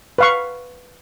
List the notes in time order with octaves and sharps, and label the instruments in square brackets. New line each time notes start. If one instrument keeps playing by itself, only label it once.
[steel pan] B4 F5 C#6